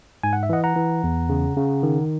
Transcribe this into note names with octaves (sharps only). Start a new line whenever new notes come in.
G#2 G#5
F#5
E5
E3 D#5 F#5
F#5 A#5
E3
E2
C#3
C#3
D#3